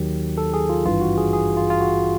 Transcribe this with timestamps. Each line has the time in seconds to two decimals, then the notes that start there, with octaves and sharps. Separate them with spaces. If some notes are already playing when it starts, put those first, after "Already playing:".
Already playing: D#2 D#3 F#3 G4
0.38 A4
0.54 G#4
0.69 F4
0.85 G#1 G2 E3 F4
1.01 F#4
1.18 G#4
1.33 G#4
1.57 F4
1.70 F4
1.81 F#4